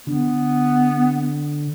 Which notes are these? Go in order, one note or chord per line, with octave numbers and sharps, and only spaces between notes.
D3 B3